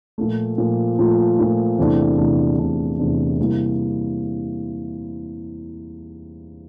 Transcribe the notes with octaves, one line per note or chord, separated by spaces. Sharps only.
A#2 F3 A3
A#2 F3 A3
A#2 F3 A3
A#2 F3 A3
E2 C3 E3 A3 D4
E2 C3 E3 A3 D4
E2 C3 E3 A3 D4
E2 C3 E3 A3 D4
C3 E3 G3 A#3 E4